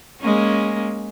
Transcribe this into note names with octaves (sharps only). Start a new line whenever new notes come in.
G#3 A#3 C#4